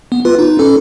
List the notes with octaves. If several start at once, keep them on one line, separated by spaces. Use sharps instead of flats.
B3
F4 B4
D#4
C#4 A4